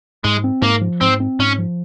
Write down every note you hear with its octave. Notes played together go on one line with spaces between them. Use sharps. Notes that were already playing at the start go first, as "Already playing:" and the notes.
G#2 G#3
C4
G#2 A#3
F3
G#2 C4
C4
G#2 C#4
F3